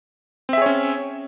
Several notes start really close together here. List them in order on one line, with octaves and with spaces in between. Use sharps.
C4 E5 G#4 C#5 C#4